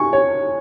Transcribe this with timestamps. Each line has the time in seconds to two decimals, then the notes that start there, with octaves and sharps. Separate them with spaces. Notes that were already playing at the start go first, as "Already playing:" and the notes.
Already playing: G#5 C#6
0.13 C#5